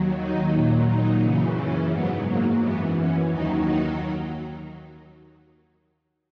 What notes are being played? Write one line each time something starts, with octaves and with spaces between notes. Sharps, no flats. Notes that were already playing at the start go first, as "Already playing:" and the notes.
Already playing: D#2 D#3 F#3
D#4
A#2 F#3
D#4
F#2 C#3 E3
C#4
G#2 F#3 B3
A#3
F#2 E3 B3
C#4
D#2 D#3 F#3 D#4
D#4